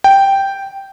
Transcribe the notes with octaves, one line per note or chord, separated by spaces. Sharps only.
G5